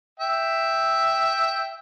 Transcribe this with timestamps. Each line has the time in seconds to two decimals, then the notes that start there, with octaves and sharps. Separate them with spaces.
0.20 E5 G5